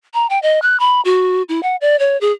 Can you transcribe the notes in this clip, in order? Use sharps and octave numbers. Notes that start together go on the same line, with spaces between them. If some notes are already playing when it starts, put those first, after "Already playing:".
A#5
G5
D#5
F#6
B5
F#4
E4
F#5
D5
C#5
G#4